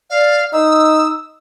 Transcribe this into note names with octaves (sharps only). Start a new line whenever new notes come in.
D5 F5
D#4 D#6 E6